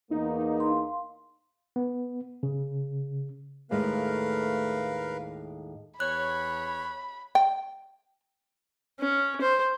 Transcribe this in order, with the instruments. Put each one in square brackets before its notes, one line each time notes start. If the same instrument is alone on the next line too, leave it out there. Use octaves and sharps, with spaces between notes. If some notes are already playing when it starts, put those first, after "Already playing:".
[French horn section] E2 A#3 [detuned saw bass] D#4
[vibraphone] F5 C6
[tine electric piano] B3
C#3
[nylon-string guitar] D#2 A2 G#3 [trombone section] A3 [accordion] A#4 B4 F5
[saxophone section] E2 C#5 [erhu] B5 [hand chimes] F#6
[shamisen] G5
[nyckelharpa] C#4
C5